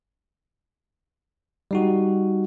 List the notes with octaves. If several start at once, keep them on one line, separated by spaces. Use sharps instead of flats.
G3 D#4 F#4